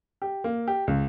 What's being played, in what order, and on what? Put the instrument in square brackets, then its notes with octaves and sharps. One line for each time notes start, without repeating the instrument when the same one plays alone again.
[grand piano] G4
A#3
G4
C#2